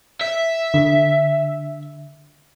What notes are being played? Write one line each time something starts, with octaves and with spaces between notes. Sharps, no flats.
E5
D3